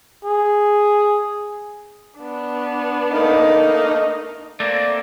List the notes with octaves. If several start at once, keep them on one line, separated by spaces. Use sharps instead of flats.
G#4
B3 D4
A3 A#3 D#4
A3 A#3 C4 D5